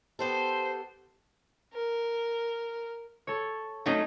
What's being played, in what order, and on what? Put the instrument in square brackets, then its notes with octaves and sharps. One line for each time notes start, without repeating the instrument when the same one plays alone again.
[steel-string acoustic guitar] B3 G4 A4 [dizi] C5
[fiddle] A#4
[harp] A4 C#5
[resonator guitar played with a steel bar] F#3 A3 C#4 [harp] D#4 D#5